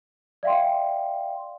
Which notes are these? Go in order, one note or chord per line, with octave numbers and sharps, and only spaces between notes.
D5 E5 F5 G5 C6